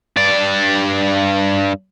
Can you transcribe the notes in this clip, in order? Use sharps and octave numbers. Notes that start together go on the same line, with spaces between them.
G2 D5